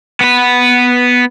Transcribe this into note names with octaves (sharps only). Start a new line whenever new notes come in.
B3 B4